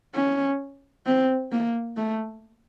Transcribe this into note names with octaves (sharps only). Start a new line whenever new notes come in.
C#4
C4
A#3
A3